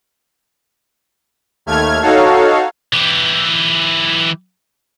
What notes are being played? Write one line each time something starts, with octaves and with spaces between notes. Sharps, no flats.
D#2 A3 F6 G#6
D#4 F#4 A4 C#5 F5
E3 G4